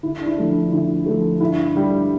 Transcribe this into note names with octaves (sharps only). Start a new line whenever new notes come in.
D2 E4
D4
E4
D3 F3 A3
D4
D2 E4
D3 F3 A3
G2 E4
D3 G3